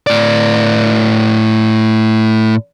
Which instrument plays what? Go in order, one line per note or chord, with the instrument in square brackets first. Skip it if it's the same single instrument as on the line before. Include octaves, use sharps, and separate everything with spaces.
[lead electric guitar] A2 D5